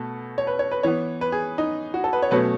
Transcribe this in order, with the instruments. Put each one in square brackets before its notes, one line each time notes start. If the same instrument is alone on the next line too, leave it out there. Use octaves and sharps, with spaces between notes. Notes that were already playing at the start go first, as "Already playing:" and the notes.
Already playing: [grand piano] B2 A3 A4
C#5
B4
C#5
B4
E3 B3 C#5
B4
G#4
D#4
F#4
A4
B4
C#5
B2 F#3 A3 C#4 B4